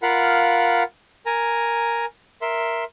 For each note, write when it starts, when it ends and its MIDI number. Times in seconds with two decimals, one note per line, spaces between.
0.02 0.83 65
0.02 0.83 70
0.02 0.83 77
0.02 0.83 78
0.02 0.83 83
1.26 2.05 70
1.26 2.05 80
1.26 2.05 82
2.42 2.84 70
2.42 2.84 76
2.42 2.84 84